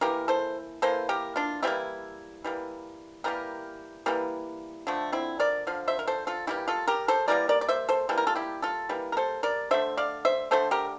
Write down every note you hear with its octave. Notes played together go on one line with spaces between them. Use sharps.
E3 A#3 G4 A#4
A4 C5
E3 A#3 A4 C5
G4 A#4
D4 F4
E3 G3 A#3 C4 E4
E3 G3 A#3
E3 G3 A#3 G4 A#4
E3 G3 A#3
D3 F3 A3
C4 E4
A#4 D5
D3 F3 F5
C5 E5
A#4
A4 C5
F4 A4
E3 G3 A#3 E4 G4
F4 A4
G4 A#4
A4 C5
E3 G3 A#3 A#4 D5
A#4 D5
D5
C5 E5
A4 C5
E3 G3 A#3 A4
A#4
F4 A4
E4 G4
F4 A4
E3 G3 A#3
A#4
A4 C5
A#4 D5
D3 A3 C5 E5
D5 F5
C5 E5
D3 A3 A4 C5
G4 A#4